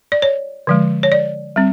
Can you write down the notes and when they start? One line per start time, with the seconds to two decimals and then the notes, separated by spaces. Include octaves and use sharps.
0.12 D5
0.22 C#5
0.67 D3 F3 G#3
1.03 C#5
1.12 D5
1.56 G3 C4